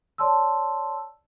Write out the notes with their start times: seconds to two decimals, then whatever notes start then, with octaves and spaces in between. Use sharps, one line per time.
0.18 C#5 D5 A5 C6 E6